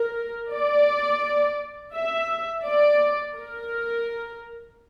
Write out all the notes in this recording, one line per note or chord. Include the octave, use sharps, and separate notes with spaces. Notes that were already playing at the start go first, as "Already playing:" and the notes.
Already playing: A#4
D5
E5
D5
A#4